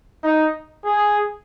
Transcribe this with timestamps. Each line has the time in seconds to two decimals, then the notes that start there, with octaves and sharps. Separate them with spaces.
0.24 D#4
0.85 G#4